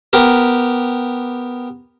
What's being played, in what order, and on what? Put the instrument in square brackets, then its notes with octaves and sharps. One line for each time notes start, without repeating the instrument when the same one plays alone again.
[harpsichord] B3 G4 A#4